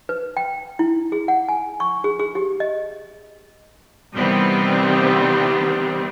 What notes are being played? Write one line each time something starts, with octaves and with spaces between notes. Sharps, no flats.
B4
G5
E4
G#4
F#5
G#5
C#6
G#4
G#4
G4
D#5
C3 D#3 E3 G3 B3 C4